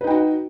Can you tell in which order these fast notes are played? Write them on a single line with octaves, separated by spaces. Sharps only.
B4 D#4 G5 F#4